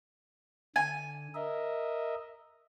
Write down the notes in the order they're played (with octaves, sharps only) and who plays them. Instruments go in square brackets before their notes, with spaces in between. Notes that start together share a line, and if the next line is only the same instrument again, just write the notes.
[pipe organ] D3 [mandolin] G#5
[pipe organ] A#4 D#5 E5